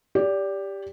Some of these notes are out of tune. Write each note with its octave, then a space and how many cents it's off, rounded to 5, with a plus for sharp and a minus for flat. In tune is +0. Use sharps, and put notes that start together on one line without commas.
G4 +10 D5 -25